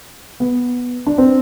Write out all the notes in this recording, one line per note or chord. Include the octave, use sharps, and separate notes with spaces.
B3
D4
C4